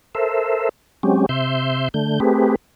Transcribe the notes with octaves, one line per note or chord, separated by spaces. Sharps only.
A4 A#4 C5 E5
F#3 G#3 C4 C#4 G4
C3 E5 C6 G6
D3 A3 G6
A3 C4 G4 G#4 B4